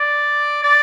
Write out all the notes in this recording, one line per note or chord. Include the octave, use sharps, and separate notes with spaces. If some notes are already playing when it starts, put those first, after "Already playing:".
Already playing: D5
D5